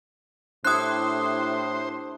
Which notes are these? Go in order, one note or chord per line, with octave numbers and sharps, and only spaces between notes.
A2 D4 E4 G4 C5 D#6 F#6